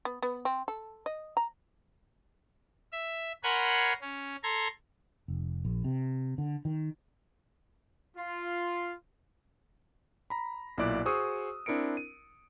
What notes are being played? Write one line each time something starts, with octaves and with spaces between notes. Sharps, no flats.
B3
B3
C4
A4
D#5
A#5
E5
A#4 C#5 F#5 G#5 B5 C6
C#4
A4 A#5 C6 G#6
F1
A#1
C3
D3
D#3
F4
A#5 B5
B1 A#2 E4 D5 D6 F#6
F#4 G#4 C5 C#6 D#6 E6
C4 D4 E4 A#4 C#7 D7
D#7